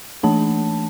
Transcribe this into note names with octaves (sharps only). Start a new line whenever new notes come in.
E3 A3 D4 A5